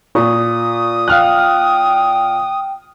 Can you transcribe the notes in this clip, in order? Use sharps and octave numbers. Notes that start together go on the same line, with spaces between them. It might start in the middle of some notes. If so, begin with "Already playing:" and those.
A#2 C#6 D#6
F5 G5 F6 F#6